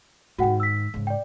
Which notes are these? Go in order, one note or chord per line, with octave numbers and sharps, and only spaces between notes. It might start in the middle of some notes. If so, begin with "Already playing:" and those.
G#2 D#3 F#4 F#5 G5
E6 B6
G#2 C#3
D5 G5